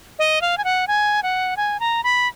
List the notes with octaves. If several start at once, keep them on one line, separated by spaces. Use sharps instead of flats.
D#5
F5
G#5
F#5
G#5
F#5
G#5
A#5
B5